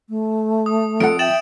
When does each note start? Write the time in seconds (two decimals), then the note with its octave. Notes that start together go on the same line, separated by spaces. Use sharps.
0.09 A3
0.66 D#6
1.00 F2 A4 F#5 D7
1.19 E5 G5 A6 E7 F#7